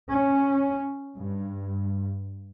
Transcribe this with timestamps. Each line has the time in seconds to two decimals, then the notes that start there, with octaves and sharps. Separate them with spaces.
0.11 C#4
1.17 G2